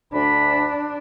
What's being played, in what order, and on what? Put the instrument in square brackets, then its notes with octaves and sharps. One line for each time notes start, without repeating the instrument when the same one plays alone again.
[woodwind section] D2 B5 [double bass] D4